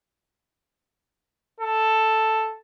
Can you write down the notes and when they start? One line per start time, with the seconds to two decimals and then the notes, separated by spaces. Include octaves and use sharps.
1.61 A4